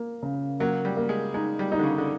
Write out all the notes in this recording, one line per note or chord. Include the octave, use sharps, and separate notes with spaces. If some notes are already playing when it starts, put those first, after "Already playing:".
Already playing: A#3
C#3
F#3 A#3
G3
A#3
G#3
G#3 D#4
G3
D#4
D3
C#3
D3